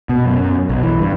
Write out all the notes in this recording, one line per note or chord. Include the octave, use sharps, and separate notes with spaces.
B2
F#2
B1
E3
G2